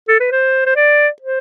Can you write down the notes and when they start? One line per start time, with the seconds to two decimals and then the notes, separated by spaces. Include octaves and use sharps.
0.08 A4
0.20 B4
0.31 C5
0.66 C5
0.76 D5
1.22 C5